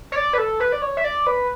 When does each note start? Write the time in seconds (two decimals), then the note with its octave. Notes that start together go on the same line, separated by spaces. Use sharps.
0.12 C#5
0.16 D5
0.33 B4
0.38 A4
0.60 B4
0.72 D5
0.82 C#5
0.97 E5
1.04 D5
1.27 B4